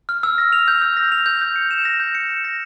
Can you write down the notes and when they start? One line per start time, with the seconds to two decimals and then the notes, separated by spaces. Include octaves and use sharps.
0.09 F6
0.23 E6
0.38 A#6
0.53 F7
0.68 G6
0.82 E6
0.97 A#6
1.12 F7
1.26 G6
1.42 G6
1.56 C#7
1.71 E7
1.85 A#6
2.00 G6
2.15 C#7
2.29 E7
2.44 A#6